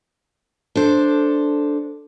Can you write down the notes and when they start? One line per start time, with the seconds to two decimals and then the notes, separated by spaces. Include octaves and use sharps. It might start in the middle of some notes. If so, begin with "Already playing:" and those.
0.75 D4 A4 C5